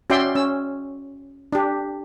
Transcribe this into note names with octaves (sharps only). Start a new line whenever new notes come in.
C#4 F#4 D5 E5 G5 C6
C#4 E6
D4 G4